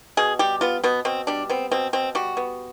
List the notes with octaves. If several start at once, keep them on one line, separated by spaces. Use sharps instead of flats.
B2 G#4
G3 G4
B3 F4
B2 B3
B2 C4
G3 D4
B3 C4
B2 C4
B2 C4
G3 F#4
B3